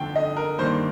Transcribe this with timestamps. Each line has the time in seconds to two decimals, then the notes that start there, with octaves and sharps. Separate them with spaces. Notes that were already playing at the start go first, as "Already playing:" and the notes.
Already playing: G1 F2 D3 A3 G5
0.16 D#5
0.37 A#4
0.58 G2 D#3 G3 A#3 C5